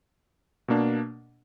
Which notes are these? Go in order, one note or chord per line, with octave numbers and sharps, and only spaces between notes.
B2 A#3 D4